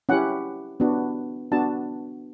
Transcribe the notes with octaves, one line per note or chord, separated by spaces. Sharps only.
C#4 E4 G4 F#5
B3 D4 F#4
B3 D4 F#4 A5